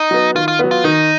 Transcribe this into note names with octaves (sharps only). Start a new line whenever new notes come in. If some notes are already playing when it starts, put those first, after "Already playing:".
Already playing: D#4
F#3 B3
D#3 F4
F4
F#3 B3
F4
D#3 D#4